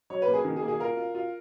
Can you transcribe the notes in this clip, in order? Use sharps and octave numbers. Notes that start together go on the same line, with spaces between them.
F#3 C#5
B4
A#3
G#4
D#3
G#4
A#3
G#4
F4 A#4
F4
F4